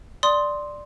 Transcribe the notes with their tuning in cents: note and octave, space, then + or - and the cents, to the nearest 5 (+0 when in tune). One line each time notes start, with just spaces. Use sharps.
D5 +5 C6 +0 D#6 +5